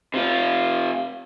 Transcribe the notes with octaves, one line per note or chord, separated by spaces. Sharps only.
C3 F4